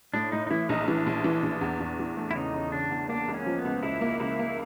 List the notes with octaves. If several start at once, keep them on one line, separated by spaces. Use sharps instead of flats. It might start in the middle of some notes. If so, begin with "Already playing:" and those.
A2 D4
A2 D#4
D#4
E3 E4
A#1 D#4
E3 D4
A#1
E3
A#1
E2
E2
E3
A3
E4
C#3 D#4
C#3
C#3 D4
E2
A#3 D4
C#2
C#4
F3
B3
C#2
C#2 E4
A#3
C#2 E4
A#3